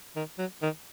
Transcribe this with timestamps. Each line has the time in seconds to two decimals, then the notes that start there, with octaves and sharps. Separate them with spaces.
0.16 D#3
0.38 F#3
0.62 D#3